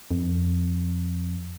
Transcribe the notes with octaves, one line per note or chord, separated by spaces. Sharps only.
F2